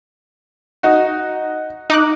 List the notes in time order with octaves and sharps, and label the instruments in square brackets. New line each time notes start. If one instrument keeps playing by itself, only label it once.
[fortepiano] D#4 F#4
[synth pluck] D#4 D6 F#6